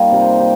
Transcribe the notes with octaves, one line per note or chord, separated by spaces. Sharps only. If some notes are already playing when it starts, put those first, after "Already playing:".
Already playing: G3 A#3 D#4 F4
C3
G4